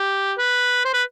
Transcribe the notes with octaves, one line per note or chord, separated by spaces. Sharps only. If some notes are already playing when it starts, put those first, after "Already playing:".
Already playing: G4
B4
C5
B4